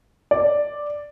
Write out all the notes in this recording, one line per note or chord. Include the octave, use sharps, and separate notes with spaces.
D5